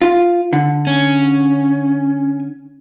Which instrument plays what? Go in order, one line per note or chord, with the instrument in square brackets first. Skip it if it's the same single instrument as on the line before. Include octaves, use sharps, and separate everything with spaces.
[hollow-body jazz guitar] F4
D3
[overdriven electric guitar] C#4